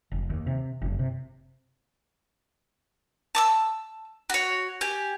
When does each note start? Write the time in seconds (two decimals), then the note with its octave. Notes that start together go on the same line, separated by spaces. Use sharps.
0.12 F1
0.30 D#2
0.47 C3
0.82 F#1
0.99 C3
3.35 A5 D6 E6
4.30 F#4 C#5
4.81 G4 G#5